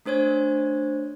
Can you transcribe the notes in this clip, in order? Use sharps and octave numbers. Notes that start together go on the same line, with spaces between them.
A3 D4 C5 C#5 G#6